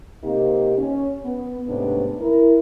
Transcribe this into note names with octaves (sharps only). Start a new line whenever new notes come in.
C3 A#3 C4 D#4 G4
C#4
B3
G#2 C3 A3 B3 C#4 D4
E4 A#4